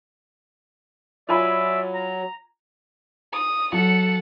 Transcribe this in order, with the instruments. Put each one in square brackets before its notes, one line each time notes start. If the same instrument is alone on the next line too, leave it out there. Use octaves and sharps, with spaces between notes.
[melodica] F#3 [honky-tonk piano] F4 G#5 B5 [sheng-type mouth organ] D5 E5
[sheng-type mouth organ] A#5
[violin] D#6
[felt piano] F#3 [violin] A4 F#5